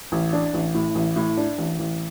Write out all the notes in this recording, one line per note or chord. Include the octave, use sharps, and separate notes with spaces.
A1
D4
A1
A2
A1
A2
D4
A1
A1